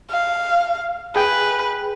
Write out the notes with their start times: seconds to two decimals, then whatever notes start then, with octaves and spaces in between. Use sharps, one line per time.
0.11 F5
1.16 G#4 B4 G5